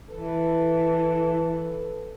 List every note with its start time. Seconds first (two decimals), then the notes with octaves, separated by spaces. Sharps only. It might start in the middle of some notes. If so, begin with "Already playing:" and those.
0.10 E3 A4 B4